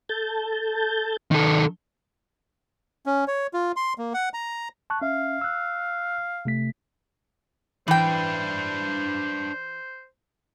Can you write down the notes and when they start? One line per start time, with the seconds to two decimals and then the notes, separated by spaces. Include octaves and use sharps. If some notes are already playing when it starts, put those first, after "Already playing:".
0.09 A4 A5 G6
1.31 D#3 A4 D5
3.06 C#4
3.28 C#5
3.54 F4
3.76 C6
3.98 A#3
4.14 F#5
4.34 A#5
4.90 A5 C#6 F#6
5.02 C#4 E5 F5
5.41 E6 F#6
6.45 C3 A3 B6
7.88 E3 D4 B4 C5 G5